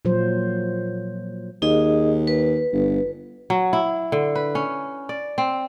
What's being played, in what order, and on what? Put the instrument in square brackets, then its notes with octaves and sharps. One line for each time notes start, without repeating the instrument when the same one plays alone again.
[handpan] A#2 F3 F#3 C5
[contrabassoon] D#2 [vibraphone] D#4 G#4 D#5
[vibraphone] B4
[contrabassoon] G1
[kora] F#3
E4
D3
B4
C#4
D5
C4